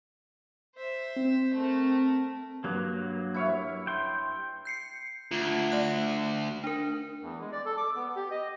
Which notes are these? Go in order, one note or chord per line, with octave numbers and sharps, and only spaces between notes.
C5 E5
C4
A3 A#4
G2 F#3 A#3
E4 C#5 F5
G5 C6
G6 C7 C#7
D2 F4
A3 F#6
D4 A#4
E2
G#3
D5
A4
D6
B3
G4
D#5